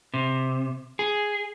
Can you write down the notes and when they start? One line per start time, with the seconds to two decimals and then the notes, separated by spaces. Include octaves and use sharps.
0.14 C3
0.99 G#4